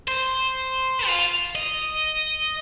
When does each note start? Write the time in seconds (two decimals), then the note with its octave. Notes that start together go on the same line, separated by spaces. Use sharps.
0.08 C5
1.07 F4
1.55 D#5